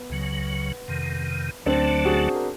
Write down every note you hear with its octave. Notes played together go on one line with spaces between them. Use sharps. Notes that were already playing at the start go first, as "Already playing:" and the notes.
Already playing: B3
C#2 C#3 F#3
F2 C3 D#3
D2 D3 F#3 A3 C4 D4
F#4 G#4
A#4